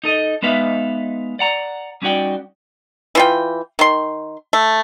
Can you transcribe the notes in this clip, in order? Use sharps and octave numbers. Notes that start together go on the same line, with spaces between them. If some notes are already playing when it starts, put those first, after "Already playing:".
D#4 A4 D#5
G#3 B3 D#4 B4 E5 F5
D5 F#5 A#5
G3 C#4 D#4 F#4 D5 G5
E3 F4 G5
D#3 C6
A3